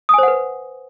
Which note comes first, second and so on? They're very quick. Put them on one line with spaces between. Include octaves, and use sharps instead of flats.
D#6 G#5 C5 F#5 B4